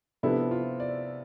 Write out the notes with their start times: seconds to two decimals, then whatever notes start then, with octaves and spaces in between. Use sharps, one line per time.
0.23 C3 F3 B3 D4 E4 A4
0.51 F4
0.80 D5